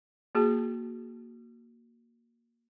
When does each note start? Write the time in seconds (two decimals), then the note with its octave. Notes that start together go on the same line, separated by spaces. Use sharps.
0.35 A#3 F#4 G#4 A5